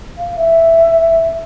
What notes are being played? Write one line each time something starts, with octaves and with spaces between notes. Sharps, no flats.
F5
E5